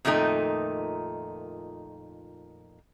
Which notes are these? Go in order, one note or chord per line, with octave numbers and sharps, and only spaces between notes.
F2 A#2 D#3 A3 D#4